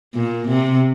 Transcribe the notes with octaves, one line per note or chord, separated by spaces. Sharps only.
A#2
C3